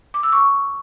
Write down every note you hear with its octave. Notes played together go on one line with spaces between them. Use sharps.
D6
E6
C#6